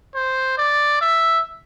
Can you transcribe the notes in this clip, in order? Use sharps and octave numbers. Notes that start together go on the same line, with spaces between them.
C5
D5
E5